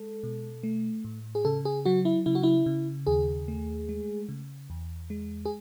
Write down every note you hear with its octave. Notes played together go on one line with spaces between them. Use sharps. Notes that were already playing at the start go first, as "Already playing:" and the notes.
Already playing: G#3 A4
B2
A3
A2
G#4
C#3 A4
G#4
F#3 F#4
E4
C#3 E4
F#4
E4
C#3
D#2 G#4
A3
G#3
C#3
E2
G#3
G#4